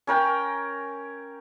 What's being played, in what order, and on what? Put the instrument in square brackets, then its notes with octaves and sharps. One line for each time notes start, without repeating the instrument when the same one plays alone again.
[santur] C#4 A#4 G5